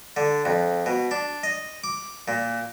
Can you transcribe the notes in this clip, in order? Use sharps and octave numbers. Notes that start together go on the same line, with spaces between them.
D3
F2
B2
D4
D#5
D6
A#2